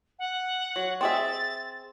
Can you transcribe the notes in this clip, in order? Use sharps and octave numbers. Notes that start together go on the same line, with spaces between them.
F#5
F#3
C4 G#4 E5 A6